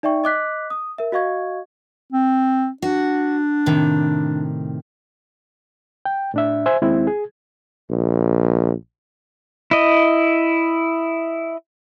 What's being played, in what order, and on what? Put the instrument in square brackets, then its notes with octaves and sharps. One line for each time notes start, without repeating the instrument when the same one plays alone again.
[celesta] D#4 D5 E5 G5 C#6
D#5 D6 F#6 B6
D#6
A#4 E5
F#4 D#5 F5 C#6 G#6
[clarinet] C4
[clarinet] D4 [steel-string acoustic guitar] F#4
[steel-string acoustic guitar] A2 C3 D#3
[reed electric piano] G5
A2 D4 E5
C5 E5 G#5
D#2 G#3 C4 E4
G#4
[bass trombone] A#1
[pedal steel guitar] E4 D#5